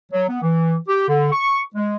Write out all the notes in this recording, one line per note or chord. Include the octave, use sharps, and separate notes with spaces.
F#3
B3
E3
G4
D3
C#6
G#3